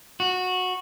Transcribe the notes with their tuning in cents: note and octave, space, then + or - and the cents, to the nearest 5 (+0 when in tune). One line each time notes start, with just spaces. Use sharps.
F#4 -15